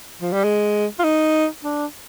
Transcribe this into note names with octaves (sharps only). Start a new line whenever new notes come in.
F3
G3
G#3
F4
D#4
D4